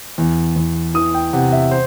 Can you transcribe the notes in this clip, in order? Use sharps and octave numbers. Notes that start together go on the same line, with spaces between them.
E2
E2
E3 D#6
G5
C3 F#5
E5
C5